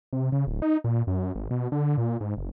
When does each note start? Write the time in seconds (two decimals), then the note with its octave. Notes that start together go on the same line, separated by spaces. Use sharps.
0.13 C3
0.32 C#3
0.47 D1
0.62 D#4
0.84 A#2
1.07 F#2
1.35 G#1
1.51 B2
1.72 D3
1.98 A#2
2.21 G#2
2.37 F#1